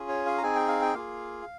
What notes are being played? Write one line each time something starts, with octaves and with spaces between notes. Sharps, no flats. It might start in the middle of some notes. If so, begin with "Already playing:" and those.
Already playing: C#4 F4 G#4
C#5
F5
A#5
C4 D#4 G#4 G#5
G5
F5
G5
A#3 F4 G#4 F5